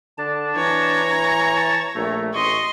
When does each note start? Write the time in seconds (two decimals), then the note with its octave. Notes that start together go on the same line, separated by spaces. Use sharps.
0.18 D3 D4 A5
0.56 E3 C#5 A#5
1.56 A5 C#6 A6
1.95 A#1 A3
2.34 A1 D#5 C6 C#6